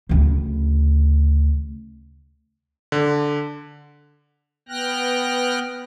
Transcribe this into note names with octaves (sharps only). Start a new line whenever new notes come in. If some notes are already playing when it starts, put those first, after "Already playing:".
D2 C#3
D3
B3 G5 F6 F#6 A#6